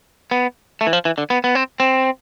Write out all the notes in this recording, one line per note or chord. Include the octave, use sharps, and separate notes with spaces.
B3
A3
E3
F3
E3
D3
B3
B3
C4
C4